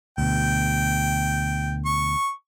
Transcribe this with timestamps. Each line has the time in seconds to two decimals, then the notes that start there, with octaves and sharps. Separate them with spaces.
0.18 D2 B2 G5
1.85 C#6